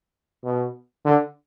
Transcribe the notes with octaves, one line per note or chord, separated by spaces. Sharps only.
B2
D3